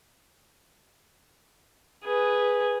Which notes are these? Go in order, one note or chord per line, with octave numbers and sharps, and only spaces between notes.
G#4 B4